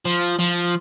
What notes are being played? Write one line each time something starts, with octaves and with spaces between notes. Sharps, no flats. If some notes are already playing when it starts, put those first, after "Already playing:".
F3
F3